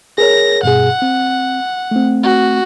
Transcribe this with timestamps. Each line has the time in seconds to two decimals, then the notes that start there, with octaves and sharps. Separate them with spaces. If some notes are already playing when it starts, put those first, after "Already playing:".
0.18 G#4 A#4 C#5 A#6
0.63 G2 B2 G#4 F#5
1.02 C4
1.91 A3 C4
2.23 F#4